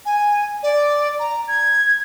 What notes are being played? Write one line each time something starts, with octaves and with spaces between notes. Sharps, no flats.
G#5
D5
A#5
G#6